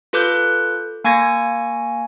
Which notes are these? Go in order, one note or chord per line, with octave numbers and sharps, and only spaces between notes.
F4 A4 B4 D6 F#6 G6
A#3 G#5 C#6 G#6 A#6